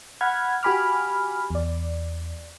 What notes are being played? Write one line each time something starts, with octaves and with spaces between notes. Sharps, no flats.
F#5 B5 F6 G#6
F#4 G4 G#5 B5 D6 F6
E2 D5